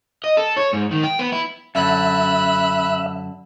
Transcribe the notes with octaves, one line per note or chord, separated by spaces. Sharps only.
D#5
A4
C#5
G#2
D#3
G5
B3
E4
F#2 D3 E5 B5 F#6